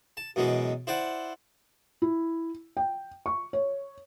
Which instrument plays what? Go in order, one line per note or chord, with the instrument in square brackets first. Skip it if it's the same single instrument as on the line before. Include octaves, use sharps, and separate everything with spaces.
[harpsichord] A5
F#2 B2 E3 G#3
E4 C5 D5 F#5
[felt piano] E4
G5
C#6
C#5